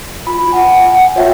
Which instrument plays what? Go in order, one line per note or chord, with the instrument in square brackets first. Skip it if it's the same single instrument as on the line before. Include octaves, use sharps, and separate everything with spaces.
[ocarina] F4 [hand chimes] B5
[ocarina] F#5 [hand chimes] G#5
[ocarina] F4 [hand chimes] C#5 E5 G5